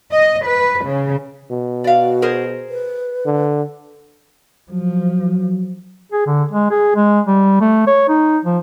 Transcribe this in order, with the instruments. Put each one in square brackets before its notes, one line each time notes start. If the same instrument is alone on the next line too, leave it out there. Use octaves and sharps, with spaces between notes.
[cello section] D#5
B4
C#3
[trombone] B2
[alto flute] F#4 [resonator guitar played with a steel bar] D5 F5
[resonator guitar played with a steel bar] G#4 A#4 C5
[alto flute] B4
[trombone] D3
[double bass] F3 [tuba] F#3
[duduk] G#4
D3
G#3
G#4
G#3
G3
A3
C#5
D#4
F3